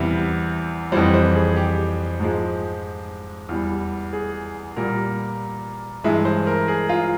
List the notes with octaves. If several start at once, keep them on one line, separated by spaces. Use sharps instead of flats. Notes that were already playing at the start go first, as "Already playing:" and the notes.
Already playing: E2 C3 E3 G3 E5
F2 E3 G3 C5
C5
G#4
G4
G#2 F3 G#3
E2 E3 G3
G#4
A#2 G3 A#4
G2 E3 G#3 E5
C5
A#4
G#4
F4